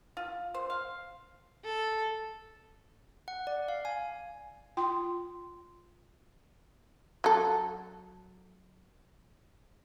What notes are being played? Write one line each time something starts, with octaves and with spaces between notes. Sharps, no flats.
F4
C5
F5
A4
F#5
D5
F5
G#5
F4 G5 C6
F#3 A4